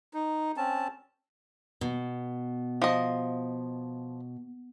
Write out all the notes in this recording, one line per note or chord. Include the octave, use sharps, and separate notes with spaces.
D#4
C4 C#4 A5
B2
F3 D#5